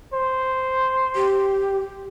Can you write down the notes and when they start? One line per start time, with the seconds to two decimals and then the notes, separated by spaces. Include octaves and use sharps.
0.14 C5
1.15 G4